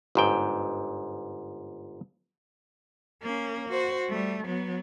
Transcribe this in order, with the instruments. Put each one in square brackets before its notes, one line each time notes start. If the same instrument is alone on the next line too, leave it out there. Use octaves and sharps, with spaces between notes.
[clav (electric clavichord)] G1 G#2 G5
[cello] A#3 C#4
F#4 C5
G3 A3
F#3 B3